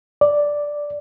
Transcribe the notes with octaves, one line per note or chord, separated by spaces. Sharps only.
D5